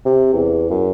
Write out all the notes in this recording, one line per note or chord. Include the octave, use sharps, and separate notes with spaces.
C3
E2
F#2